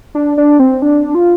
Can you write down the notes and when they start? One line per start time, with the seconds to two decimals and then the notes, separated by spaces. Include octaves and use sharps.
0.15 D4
0.37 D4
0.59 C4
0.82 D4
1.15 F4